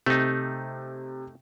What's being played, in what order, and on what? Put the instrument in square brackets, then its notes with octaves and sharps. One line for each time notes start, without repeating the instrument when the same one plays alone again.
[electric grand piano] C3 [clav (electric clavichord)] A3 D#4